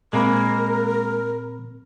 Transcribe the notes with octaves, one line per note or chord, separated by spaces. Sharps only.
A#2 G#3 A#3 C4 A#4 B5